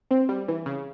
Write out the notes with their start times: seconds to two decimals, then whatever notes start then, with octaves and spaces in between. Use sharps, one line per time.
0.11 C4
0.29 G3
0.48 E3
0.66 C#3